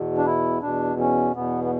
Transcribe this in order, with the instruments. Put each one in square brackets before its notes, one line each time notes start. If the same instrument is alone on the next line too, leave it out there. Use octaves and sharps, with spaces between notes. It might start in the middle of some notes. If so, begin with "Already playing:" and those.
Already playing: [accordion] E2 B2
D4
E4
E2 B2 D4
C#4
E2 B2 B3
B3